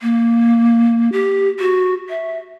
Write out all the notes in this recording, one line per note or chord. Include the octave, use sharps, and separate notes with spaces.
A#3
G4
F#4
E5